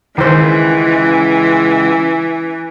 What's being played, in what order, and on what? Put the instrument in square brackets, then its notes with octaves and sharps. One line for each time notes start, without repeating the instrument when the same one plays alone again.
[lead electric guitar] C#2 [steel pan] D#3 C5 [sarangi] E3